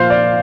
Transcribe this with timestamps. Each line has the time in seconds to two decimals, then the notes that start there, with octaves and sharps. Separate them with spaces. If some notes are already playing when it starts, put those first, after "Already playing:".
Already playing: A#2 F3 C5 F5
0.10 D5